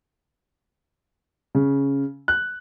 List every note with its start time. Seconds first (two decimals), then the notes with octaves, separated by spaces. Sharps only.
1.55 C#3
2.28 F#6